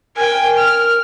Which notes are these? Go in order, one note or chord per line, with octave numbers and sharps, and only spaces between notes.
A#4 G5 G#5
F6